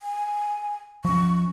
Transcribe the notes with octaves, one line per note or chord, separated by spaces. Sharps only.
G#5
F3 C#4 C#6